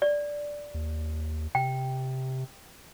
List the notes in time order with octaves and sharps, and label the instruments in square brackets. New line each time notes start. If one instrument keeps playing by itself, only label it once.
[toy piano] D5
[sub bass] D#2
[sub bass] C3 [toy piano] G5